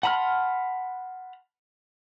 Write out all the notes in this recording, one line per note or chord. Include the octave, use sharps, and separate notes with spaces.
F#5 A5 B5 C6 F6